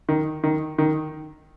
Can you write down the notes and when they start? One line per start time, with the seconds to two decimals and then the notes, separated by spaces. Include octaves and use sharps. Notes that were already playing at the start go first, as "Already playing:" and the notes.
0.09 D#3
0.44 D#3
0.78 D#3